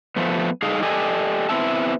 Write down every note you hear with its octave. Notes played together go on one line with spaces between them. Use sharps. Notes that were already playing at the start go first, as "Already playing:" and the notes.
F3 A3 B3
G3 D#4 G#4 A4 D#5 F5
G4 A4 D5 D#5 G#5
B3 C4 E4 E5 A5